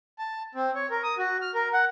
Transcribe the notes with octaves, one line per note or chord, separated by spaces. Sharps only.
A5
C4
C#5
A#4
D#6
F#4
F6
A#4
F#5